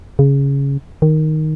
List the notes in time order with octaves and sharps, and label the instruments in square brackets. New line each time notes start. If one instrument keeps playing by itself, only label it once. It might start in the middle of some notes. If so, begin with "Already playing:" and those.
[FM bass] C#3
D#3